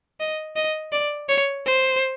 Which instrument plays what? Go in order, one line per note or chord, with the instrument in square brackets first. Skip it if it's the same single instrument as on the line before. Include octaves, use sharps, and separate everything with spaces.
[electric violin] D#5
D#5
D5
C#5
C5